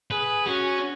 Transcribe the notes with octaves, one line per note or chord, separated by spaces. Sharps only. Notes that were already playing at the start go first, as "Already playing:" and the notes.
G#4 B4
C#4 F#4